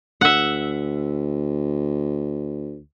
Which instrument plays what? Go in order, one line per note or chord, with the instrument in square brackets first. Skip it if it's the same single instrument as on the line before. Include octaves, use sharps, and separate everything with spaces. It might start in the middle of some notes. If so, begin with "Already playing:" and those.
[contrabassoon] D2 [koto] E5 F#5